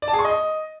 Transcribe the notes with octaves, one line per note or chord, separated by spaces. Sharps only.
D5
A5
G#4
C#6
D#5